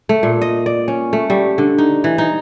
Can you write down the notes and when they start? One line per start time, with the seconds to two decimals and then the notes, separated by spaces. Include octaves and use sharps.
0.09 A3
0.23 A#2
0.41 D#5
0.66 D5
0.88 C#4
1.13 A3
1.30 G3
1.58 D3
1.78 D#4
2.04 E3
2.18 D#4